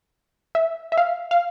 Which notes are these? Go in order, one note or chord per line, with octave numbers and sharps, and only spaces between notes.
E5
E5
F5
F5